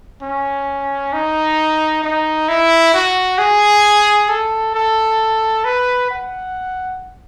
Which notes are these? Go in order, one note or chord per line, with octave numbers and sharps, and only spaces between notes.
C#4
D#4
D#4
E4
F#4
G#4
A4
A4
B4
F#5